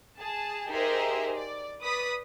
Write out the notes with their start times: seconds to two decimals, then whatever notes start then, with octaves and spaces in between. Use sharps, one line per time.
0.19 G#4 A5
0.69 D#4 G4 G#4 A#4 C5 E5
1.35 D5
1.83 B4 D5 D#6 B6